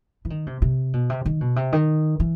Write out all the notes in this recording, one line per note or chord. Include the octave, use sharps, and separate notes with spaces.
E3
D#3
C3
C3
B2
C3
D#3
B2
C3
D#3
E3